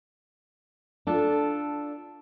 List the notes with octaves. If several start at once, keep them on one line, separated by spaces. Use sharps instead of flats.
D4 F4 A4